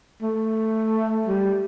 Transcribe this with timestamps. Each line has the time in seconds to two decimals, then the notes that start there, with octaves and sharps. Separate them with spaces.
0.22 A3
1.28 G3